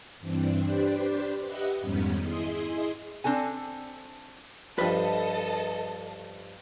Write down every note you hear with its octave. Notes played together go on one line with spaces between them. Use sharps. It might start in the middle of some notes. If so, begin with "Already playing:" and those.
G2 E3 C4 D4
D4 G4 B4 C5 D5
G4 B4 D#5 E5 F#5
F2 G#2 D#3 G3 B3 C#4
E4 G#4 D#5 C6
C4 D4 A4 G#5
G2 F3 A4 B4 D#5 A5